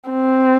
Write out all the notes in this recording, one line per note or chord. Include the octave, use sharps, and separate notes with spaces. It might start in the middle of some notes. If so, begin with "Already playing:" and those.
C4